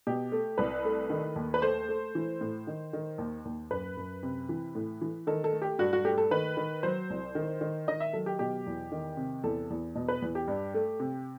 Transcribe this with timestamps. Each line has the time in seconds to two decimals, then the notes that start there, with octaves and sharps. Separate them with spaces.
0.07 B2 G4
0.32 A3
0.58 C2 B4
0.85 A3
1.10 D#3
1.36 D#2
1.54 B4
1.62 A3 C5
1.89 A3
2.15 E3
2.41 A2
2.67 D#3
2.93 D#3
3.18 D#2
3.45 D#2
3.71 F#2 B4
3.97 F#2
4.23 C3
4.49 E3
4.75 A2
5.01 E3
5.27 D#3 A4
5.44 A4
5.53 A3
5.62 G4
5.79 G2 F#4
5.93 F#4
6.05 A3 G4
6.18 A4
6.31 D#3 B4
6.57 D#3
6.83 F#3 C5
7.10 C2
7.35 D#3
7.61 D#3
7.88 D#3 D#5
8.00 E5
8.13 F#3 A4
8.26 G4
8.39 B2 G4
8.66 E2
8.92 D#3
9.17 C3
9.44 E2 A4
9.70 E2
9.95 B2
10.08 B4
10.22 E2
10.35 G4
10.48 G2
10.74 A3
11.00 C3